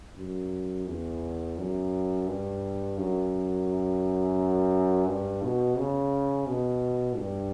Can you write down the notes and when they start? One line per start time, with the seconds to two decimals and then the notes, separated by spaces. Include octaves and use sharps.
0.18 F#2
0.88 E2
1.58 F#2
2.27 G2
2.98 F#2
5.08 G2
5.43 B2
5.77 C#3
6.48 B2
7.17 G2